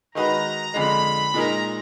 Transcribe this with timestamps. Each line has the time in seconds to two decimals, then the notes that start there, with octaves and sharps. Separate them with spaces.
0.15 D#3 G#3 D#4 F#4 B4 A#5
0.74 F2 D3 G#3 B5
1.34 A#2 G#3 D#4 A#4 A#5